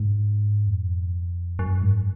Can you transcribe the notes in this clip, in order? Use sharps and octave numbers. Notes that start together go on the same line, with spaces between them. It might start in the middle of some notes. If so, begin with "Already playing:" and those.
Already playing: G#2
F2
F#2
G#2